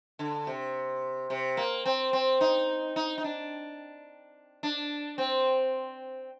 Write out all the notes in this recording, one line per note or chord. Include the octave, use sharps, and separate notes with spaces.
D3
C3
C3
A#3
C4
C4
D#4
D#4
D#4
D4
D4
C4